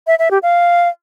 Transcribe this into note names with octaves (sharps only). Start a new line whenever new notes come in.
E5
E5
G4
F5